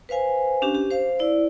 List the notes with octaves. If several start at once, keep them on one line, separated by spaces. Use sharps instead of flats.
B4 C5 F5 G#5
C#4 D4 G4
G4
C5 F5
E4 D5